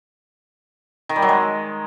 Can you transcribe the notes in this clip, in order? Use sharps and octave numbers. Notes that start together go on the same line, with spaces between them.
D#3
G3
F#3
G#3